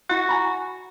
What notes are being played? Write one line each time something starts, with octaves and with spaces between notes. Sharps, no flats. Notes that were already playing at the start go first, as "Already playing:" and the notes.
E4 F#4 F#6
G#5 A#5 B5